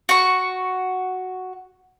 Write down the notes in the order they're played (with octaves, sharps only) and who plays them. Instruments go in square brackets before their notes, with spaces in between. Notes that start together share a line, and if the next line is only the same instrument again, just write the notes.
[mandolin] F#4 C#6